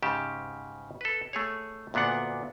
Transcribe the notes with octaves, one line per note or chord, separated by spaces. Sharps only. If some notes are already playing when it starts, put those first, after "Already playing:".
G#2 C#3 G4 A5
A4 B4
A3 G#4 C#5
D2 A#2 B3 D4 F#5